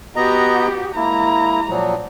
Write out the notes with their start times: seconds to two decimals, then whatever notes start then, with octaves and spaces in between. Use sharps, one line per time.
0.16 B3 F#4 G4 D#5 A#5
0.96 G#3 A#3 E4 A#5
1.69 A#2 F3 F#3